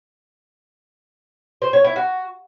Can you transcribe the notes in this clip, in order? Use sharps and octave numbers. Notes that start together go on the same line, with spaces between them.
C5
C#5
E4
F#4